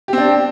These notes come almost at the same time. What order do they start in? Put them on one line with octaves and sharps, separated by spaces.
G4 C4 D4